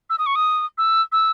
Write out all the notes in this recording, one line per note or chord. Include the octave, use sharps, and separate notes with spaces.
E6
D#6
C#6
D#6
E6
E6